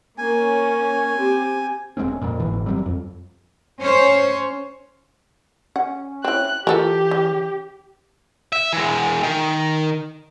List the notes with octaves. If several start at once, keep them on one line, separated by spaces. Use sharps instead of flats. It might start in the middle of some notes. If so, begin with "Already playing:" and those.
A#3 C#4 G#5
C4 G4
F1 G#3 C4 C#4
F2 A#2
G1 G#2 E3
F#1 F#3 G3 C4
F2
C#4 C5 C#5
C#4 F#5
C4 E4 F#6
E3 F4 G4 A4 A#4
C#3
E5
E3 G#3
D#3